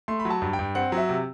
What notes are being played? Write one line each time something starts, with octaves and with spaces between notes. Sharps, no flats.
A3 C6
B5
F#3
A5
G2
G5
G2
C4 F#5
F#3
E5
C3